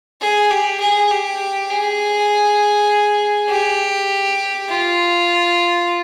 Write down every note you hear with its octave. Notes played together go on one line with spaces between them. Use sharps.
G#4
G4
G#4
G4
G#4
G4
F4